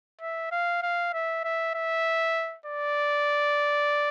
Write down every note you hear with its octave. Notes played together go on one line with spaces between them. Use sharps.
E5
F5
F5
E5
E5
E5
D5